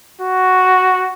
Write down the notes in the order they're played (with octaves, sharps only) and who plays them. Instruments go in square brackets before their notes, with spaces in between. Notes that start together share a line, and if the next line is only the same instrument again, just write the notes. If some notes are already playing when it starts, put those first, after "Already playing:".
[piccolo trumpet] F#4